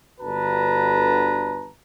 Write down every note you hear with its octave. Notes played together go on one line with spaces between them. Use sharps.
G1 D3 F#4 B4 A5 A#5